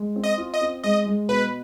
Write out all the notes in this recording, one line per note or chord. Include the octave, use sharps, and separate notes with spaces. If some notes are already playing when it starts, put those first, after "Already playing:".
Already playing: G#3
C4
D#5
F4
D#5
C4
G#3 D#5
G#3
B2 B4